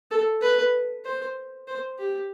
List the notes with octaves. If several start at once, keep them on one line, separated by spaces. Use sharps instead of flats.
A4
B4
C5
C5
G4